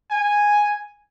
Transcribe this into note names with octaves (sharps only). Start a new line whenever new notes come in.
G#5